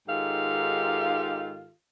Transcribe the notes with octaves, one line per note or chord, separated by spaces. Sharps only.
G#2 D#3 F4 G4 A4 F5